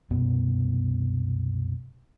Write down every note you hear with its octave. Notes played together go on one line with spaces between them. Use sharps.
C2 F#2 B2 B3